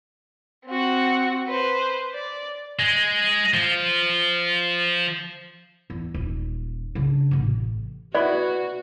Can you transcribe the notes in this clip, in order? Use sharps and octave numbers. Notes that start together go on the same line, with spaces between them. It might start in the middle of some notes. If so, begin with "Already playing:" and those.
C4 F#4
B4 C5
D5
G#3
F3
E2
D#1
C#3 D4
A1 C3
B3 E4 F#4 B4 D5